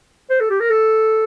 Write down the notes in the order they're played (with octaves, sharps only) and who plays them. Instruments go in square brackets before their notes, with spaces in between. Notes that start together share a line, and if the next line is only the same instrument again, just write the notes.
[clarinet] C5
A4
G4
A#4
A4